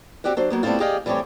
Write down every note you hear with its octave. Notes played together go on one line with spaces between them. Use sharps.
C4 F#4 G4 D5 F#5
F#3 D4 C5
F#3 A#3 B3
G3 A3 B3 C4 E4 F4
G4 G#4 D5 D#5 F5 G5
E3 G3 A3 C4 G4 C#5